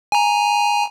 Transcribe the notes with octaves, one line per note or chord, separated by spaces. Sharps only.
G#5 A#5